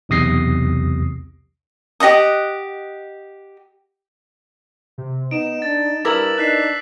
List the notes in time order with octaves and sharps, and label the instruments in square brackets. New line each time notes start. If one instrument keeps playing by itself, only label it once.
[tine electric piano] B1 E2 C3 D#6 A#6 C7
[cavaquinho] G4 D#5 F#5 D#6
[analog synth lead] C3
[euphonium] B3 [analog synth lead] D#4 [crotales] D7 E7
[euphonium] D4 [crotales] A6
[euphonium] G2 [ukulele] E4 A#4 B4 [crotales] D6 E6 F#7
[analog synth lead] D4 [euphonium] D#4 [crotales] F#6 B6 C7